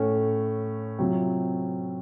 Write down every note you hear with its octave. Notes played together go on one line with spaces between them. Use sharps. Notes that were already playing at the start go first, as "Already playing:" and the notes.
Already playing: A2 A3 C#4
C3 F#3 C4 F4